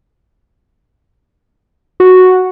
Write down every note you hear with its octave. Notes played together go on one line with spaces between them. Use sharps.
F#4